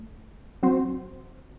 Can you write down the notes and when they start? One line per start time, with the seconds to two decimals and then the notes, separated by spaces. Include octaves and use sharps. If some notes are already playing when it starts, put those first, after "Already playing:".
Already playing: A3
0.63 F#3 C4 F#4 C5